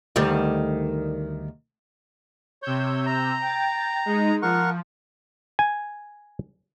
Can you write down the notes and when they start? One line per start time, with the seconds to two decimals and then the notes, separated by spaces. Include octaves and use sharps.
0.16 D2 D#3 G3
2.62 C3 C#5 E6 G6
3.06 A#5
3.41 G5 A6
4.06 G#3 D#4
4.42 F3 A#4 F#5 C#6
5.59 G#5